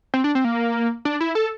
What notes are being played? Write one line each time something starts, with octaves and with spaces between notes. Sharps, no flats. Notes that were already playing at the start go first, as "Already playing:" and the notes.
C4
D4
C4
A#3
D4
E4
A4